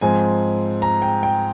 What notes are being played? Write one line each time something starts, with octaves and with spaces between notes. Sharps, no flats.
G#2 F3 C4 G#5
A#5
G5
G5